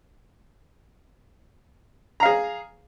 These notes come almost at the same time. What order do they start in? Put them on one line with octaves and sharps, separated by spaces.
A#5 F5 G#4